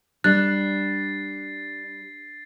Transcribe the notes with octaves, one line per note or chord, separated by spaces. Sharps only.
G3 D4 F#6 A6 C7